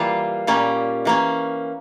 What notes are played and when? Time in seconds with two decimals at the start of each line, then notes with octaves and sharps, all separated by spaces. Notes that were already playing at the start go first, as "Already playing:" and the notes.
Already playing: E3 G3 A#3 F4
0.47 A#2 G3 A#3 C#4
1.05 E3 A#3 C#4